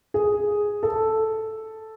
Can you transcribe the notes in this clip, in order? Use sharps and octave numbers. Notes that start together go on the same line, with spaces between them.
G#4
A4